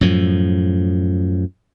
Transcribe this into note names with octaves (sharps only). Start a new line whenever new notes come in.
F#2 A2 F3